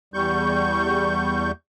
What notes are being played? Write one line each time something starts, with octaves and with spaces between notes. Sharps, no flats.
E2 G3 C#6 G6